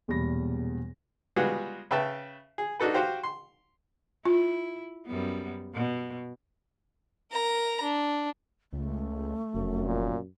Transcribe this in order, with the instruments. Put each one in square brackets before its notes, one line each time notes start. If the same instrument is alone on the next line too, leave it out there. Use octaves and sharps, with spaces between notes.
[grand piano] E1 E2 A#2 G3 B5 A#6
[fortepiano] G3 G#3 B3 F4 F#4 G#4
C#3 B4 E5 G5 A5
G#4
D4 D#4 F#4 A4 B4
F#4 G4 C5 F5 G5
C6
[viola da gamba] E4 [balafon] F4
[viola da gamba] F#2 G3 B3
B2
[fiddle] A#4 A#5
D4
[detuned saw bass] C#2 [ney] A3
[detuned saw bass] F1 [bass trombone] F#2
[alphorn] A#2